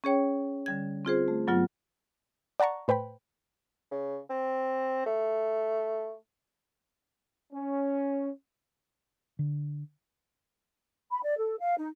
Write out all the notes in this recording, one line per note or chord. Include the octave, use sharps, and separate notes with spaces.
C#4 G#4 C#5 G5
D3 G3 G#6
C4 F4 G#4 C5
A3
G2 F#3 B3 F4
D5 F#5 A5 A#5 C#6
A2 B4 C5 G5 B5
C#3
C4
A3
C#4
D3
B5
D5
A4
F5
D#4